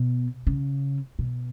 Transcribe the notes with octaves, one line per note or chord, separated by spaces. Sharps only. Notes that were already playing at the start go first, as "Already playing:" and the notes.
Already playing: B2
C#3
B2